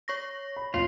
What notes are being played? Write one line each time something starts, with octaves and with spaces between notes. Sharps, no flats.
C#5 C#6 A#6
B5
A1 F2 F4 C#5